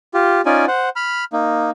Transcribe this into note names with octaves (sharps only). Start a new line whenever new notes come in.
F4 G4
C#4 D#4 F4 D5 G#5
C5 F#5
B5 F6
A#3 D#4